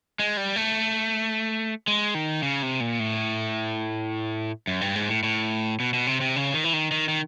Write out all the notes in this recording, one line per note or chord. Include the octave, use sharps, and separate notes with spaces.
G#3
G3
A3
G#3
D#3
C#3
C3
A#2
A2
F#2
G2
G#2
A2
A2
B2
B2
C3
C3
C#3
D#3
E3
D#3
D#3
D#3